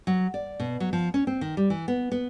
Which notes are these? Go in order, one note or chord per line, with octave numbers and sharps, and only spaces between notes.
F#3
D5
B2
F#3
F3
C#4
C4
D#3
G3
E3
B3
B3